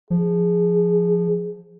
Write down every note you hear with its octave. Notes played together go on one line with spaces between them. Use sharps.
F3 G#4